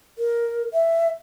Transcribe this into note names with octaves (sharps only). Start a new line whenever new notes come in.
A#4
E5